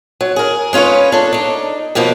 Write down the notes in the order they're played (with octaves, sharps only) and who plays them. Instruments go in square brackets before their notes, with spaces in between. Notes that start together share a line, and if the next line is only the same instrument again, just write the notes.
[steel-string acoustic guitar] F#3
G#4 A#4
G#3 C#4 F4 B4 C#5
D4 A4
D4 D#4
D#2 B2 F3 A#3 B4